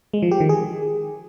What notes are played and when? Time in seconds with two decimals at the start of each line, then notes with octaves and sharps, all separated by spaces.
0.13 G#3
0.22 F3
0.31 G4
0.40 D#3
0.49 G#4